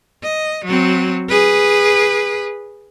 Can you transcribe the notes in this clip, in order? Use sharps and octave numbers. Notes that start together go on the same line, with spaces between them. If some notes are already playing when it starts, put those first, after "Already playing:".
D#5
F#3 C4
G#4 B4